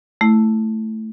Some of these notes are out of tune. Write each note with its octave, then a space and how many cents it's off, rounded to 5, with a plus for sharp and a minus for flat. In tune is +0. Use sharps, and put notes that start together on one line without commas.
A3 +0 E4 +0